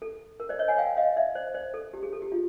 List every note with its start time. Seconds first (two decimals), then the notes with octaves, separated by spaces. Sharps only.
0.02 A4
0.40 A#4
0.49 C5 D5
0.59 C#5 D#5
0.68 F#5 G#5
0.78 F5 G5
0.97 D#5 F5
1.17 D5 E5
1.35 C5 D5
1.54 C5 D5
1.74 A4
1.94 G4
2.03 G#4
2.13 A4
2.22 G4
2.32 F4